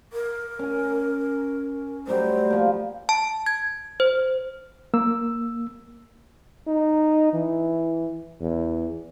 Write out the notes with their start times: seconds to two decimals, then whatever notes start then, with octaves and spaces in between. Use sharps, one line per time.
0.13 A#4
0.59 C#4 G#5
2.07 A2 F#3 G3 C5
2.50 F3 A#3
3.09 A5
3.46 G#6
4.00 C5
4.94 A#3 E6
6.68 D#4
7.33 E3
8.41 E2